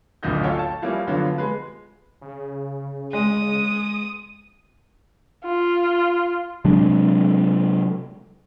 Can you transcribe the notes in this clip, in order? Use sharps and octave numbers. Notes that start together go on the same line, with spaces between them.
D1 G#1 D2 A#2 D#5 G6
C#4 F4 A4 C#5 G5
A5
E3 F3 G3 A#3 C#4 E4
D3 F3 F#3 B3 F4
G#3 B4
C#3
G#3 D#6
F4
C3 F#3 G#3 D4